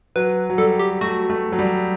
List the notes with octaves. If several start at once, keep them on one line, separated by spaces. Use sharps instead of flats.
F#3 B4
F#3
G3 A4
G4
A3 F#4
A3
F#3
G3